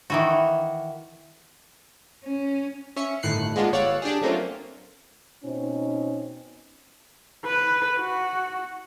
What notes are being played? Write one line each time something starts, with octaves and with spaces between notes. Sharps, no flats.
D#3 E3 F#4
C#4
C#4 E5 C#7
G1 A2 D#3 F#6 C7 C#7
G#3 A#3 B3 D4 F4
G1 C#5 D5 F5 F#5 E6
D4 G4 G#4
F#3 A3 A#3 C4 C#4 F4
B2 C4 C#4 D#4
B4
F#4